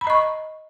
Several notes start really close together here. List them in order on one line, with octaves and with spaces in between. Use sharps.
B5 A#5 D#5 C#6